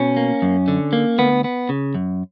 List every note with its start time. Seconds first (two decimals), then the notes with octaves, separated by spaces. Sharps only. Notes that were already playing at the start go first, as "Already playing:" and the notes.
Already playing: B2 C#4
0.17 A#3
0.42 F#2
0.68 D3
0.93 A#3
1.18 D2 B3
1.44 B3
1.69 C#3
1.95 F#2